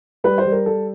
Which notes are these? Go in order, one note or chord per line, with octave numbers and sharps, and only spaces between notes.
G3 B4
C5
G3
A#4
G3 A4